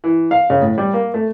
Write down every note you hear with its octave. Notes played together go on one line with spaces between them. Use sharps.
E3
F5
C#3
A2
G3
A#3
A3